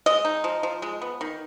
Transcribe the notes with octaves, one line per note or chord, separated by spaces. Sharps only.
G#3 D#5
D#4
F3
F3
G#3
B3
D#3